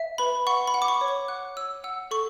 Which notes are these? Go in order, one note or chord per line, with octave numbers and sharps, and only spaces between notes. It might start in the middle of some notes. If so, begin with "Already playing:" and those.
Already playing: E5
B4 B5
F#5 C#6
B5
F#5
D6
C#6
C#5
D6
F#5 F#6
C#5 E6
F#5 E6
A4 C#6